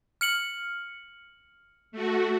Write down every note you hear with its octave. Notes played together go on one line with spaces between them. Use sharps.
F6 C#7 F#7
A3 F#4